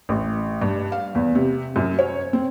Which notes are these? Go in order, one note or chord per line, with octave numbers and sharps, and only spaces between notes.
A1
G2
F5
E2
C3
F#2
C#5
C4